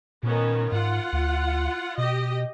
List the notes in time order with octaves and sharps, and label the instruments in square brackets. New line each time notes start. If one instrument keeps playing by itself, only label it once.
[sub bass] A#2 [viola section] D#3 B3 C#4
[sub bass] G#2 [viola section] F4 F#5
[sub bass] D2
[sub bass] B2 [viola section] G4 D#5